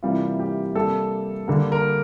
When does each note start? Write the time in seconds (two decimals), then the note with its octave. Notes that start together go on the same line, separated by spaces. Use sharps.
0.03 C3 E3 G3 A#3 F4
0.39 G4
0.75 C3 G3 A#3 A4
1.48 D3 G3 A#3
1.72 A#4